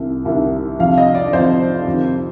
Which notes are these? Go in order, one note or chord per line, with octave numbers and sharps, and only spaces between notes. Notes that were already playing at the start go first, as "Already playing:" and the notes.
Already playing: C2 C3 D#3
C2 C3 D#3
F2 C3 F3 F5
D#5
D5
F2 C3 F3 C5
F2 C3 D#3